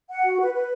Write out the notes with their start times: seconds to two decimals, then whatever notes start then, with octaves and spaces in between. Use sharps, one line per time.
0.09 F#5
0.23 F#4
0.39 B4
0.53 B4